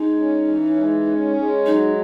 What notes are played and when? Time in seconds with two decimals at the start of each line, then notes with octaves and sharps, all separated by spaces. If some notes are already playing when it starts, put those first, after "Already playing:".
Already playing: G#3 D#4
0.17 C#4
0.48 E3
0.76 G#3
1.07 C#4
1.36 G#3
1.65 F#3 D#4